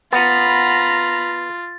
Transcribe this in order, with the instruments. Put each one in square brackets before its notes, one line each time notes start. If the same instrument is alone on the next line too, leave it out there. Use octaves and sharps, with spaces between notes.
[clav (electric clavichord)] B3 [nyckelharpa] F4 [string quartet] A#5 B5 [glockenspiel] A6